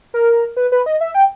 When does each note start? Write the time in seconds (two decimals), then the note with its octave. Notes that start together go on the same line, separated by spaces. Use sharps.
0.14 A#4
0.57 B4
0.72 B4
0.86 D#5
1.01 E5
1.14 G5